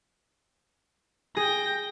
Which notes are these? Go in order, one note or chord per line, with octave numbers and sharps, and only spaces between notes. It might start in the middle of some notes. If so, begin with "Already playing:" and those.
G#4 G5 A#6